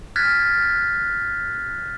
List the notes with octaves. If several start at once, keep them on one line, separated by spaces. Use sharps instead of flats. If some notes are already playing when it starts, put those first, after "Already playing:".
F6 F#6 G#6 A6 B6